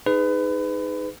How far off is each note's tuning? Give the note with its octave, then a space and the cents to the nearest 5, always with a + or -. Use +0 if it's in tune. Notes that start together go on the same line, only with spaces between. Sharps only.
D#4 +0 G#4 +0 B4 +30